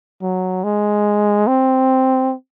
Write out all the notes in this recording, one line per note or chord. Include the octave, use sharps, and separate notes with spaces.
F#3
G#3
C4